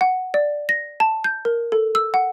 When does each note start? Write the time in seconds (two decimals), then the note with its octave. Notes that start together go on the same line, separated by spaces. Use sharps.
0.01 F#5
0.34 D5
0.69 A#6
1.00 A5
1.24 G6
1.45 A#4
1.72 A4
1.95 E6
2.14 F#5